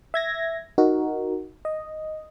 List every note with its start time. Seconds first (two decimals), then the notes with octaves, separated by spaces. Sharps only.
0.14 E5 G#6 A#6
0.78 D#4 F#4 A#4
1.65 D#5